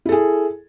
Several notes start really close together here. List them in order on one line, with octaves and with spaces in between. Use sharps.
E4 A4 G#4